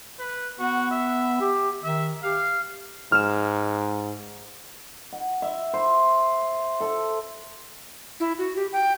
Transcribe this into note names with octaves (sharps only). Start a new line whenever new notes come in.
B4
B3 F#4
E5
G4
D#3 E5
G4 F5
G#2 F6 E7
F#5
E5
C5
A4
E4
F#4
G4
G5